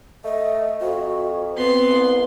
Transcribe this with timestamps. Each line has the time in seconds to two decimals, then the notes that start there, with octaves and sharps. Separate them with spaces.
0.24 A3 D#5
0.81 F2 F#4
1.57 B3 C4 C6
1.89 C2